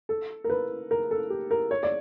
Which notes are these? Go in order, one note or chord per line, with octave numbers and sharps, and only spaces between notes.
A4
A#4
B4
A#4
A4
G4
A#4
C#5
D5